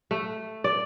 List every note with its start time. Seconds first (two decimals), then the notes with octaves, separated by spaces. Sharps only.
0.11 A3
0.64 D5